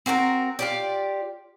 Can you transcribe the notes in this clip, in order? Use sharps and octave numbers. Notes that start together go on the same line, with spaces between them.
C4 F#4 A4 A#4
F4 G4 D5